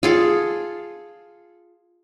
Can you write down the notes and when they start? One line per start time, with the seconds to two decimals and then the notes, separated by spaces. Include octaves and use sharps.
0.03 F4 G#4 A4